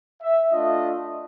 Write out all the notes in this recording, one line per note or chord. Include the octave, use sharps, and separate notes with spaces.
E5
A3 D4 F4 D#5